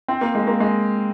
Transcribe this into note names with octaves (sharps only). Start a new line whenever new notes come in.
C4
A#3
G#3
A#3
G#3